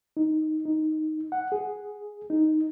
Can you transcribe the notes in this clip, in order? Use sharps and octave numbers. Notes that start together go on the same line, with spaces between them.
D#4
D#4
F#5
G#4
D#4